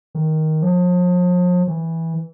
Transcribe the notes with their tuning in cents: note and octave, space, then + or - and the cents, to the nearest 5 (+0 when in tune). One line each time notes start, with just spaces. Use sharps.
D#3 +10
F3 +40
E3 -10